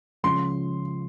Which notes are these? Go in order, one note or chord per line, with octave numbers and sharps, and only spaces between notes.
C#2 C#3 F3 C6